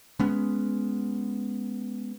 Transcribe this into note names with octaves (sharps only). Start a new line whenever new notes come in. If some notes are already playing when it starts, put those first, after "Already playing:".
G#3 B3 C#4